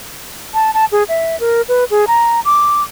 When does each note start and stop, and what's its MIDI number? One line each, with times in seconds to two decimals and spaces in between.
0.54 0.71 81
0.74 0.85 81
0.92 1.03 68
1.09 1.38 76
1.40 1.62 70
1.69 1.84 71
1.91 2.05 68
2.07 2.40 82
2.45 2.83 86